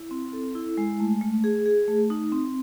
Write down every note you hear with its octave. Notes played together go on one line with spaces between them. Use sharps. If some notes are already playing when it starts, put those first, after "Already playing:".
Already playing: E4
C4
A4
E4
G#3
A3
A3
G#4
G#4
A3
D#4
C4